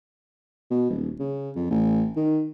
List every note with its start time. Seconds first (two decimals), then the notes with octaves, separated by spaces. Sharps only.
0.71 B2
0.90 D#1
1.20 C#3
1.56 F2
1.70 A1
2.16 D#3